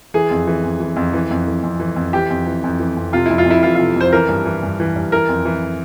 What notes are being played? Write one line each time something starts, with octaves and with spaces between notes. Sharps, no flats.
E3 G#4
F2
E3
F2
E3
F2
E3
F2
E3
F2
E3
F2
E3 G4
F2
E3
F2
E3
F2
C3 F4
E4
F2
F4
F2
E4
E3 F4
F4
C3
F2 C5
E3 A#4
G2
E3
G2
E3
G2
E3 A#4
F2
E3